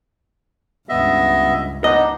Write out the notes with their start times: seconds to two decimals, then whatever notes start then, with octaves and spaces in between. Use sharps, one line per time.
0.89 C#2 G2 B3 D#5 E5
1.84 B3 D4 D#4 D#5